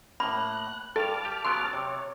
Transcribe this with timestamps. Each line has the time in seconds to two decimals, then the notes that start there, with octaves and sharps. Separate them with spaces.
0.20 A2 A#3 B5 F#6
0.96 G2 A4 A5 D6 F6
1.25 G4
1.45 C#3 F#3 B3 C6
1.73 C3 C#5